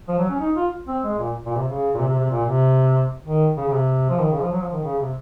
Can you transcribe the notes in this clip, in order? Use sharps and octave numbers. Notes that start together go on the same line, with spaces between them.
F3
F#3
C#4
D#4
F4
C4
G#3
A#2
A#2
C3
C#3
A#2
C3
C3
C3
A#2
C3
D#3
C#3
C#3
C3
F3
D#3
C#3
F3
F#3
F3
D#3
C#3
C3